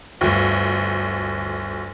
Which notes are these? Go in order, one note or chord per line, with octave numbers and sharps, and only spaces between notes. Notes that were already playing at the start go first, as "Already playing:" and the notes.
G1 D2